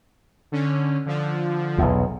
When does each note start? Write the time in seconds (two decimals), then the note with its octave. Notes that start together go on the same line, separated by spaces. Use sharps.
0.52 D3 C#4
1.06 D3 F3
1.78 B1 E2